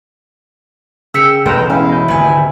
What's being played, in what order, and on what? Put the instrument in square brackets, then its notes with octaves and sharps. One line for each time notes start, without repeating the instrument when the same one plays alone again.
[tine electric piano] C#3 B6 C#7 [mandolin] A#3 G5 E6
[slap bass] E1 A1 G#3 [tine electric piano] A4 B4 A#5 [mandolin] C5 [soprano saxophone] G5
[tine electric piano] B3 C#4 [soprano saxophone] E4 [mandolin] F5
[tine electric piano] D#5 G6
[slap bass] G#1 D2 C3 [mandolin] B4 G#5